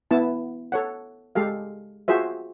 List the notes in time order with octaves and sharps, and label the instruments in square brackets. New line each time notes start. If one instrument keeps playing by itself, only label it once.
[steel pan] B3 E4 A5
A4 C#5 F#5
G#3 G4 A4 F5
F4 F#4 G#4 C5 E5